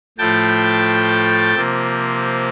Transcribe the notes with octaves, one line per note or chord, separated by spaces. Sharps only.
A2 F3 A3 G5 A5
C3 F3 A#3